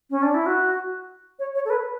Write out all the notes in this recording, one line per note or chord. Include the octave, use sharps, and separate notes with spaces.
C#4
D4
E4
F#4
C#5
C#5
A4
B4